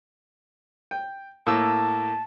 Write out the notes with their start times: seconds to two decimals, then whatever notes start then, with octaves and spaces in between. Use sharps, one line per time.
0.91 G5
1.47 A2 A#3 A5 E6